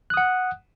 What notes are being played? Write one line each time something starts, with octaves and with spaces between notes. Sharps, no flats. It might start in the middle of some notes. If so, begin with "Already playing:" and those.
F#5 D#6 F#6